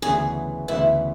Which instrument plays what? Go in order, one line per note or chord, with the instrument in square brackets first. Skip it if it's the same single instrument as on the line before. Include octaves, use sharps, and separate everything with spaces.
[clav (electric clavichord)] D2 C#3 E3 B3 [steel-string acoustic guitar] G#4
[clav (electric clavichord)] D2 C#3 E3 B3 [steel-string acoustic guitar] E4